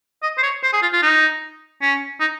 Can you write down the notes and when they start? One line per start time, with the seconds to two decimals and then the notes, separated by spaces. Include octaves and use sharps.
0.23 D#5
0.38 C5
0.43 C#5
0.63 C5
0.73 G#4
0.82 F4
0.93 F4
1.02 D#4
1.82 C#4
2.20 D#4